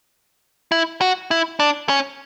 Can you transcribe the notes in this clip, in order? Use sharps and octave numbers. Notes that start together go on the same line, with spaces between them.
E4
F#4
E4
D4
C#4